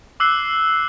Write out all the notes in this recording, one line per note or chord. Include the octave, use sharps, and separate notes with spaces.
D6 E6 F#6 C7 G7